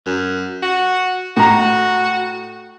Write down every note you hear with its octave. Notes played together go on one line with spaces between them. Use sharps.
F#2
F#4
A2 F#4 A#5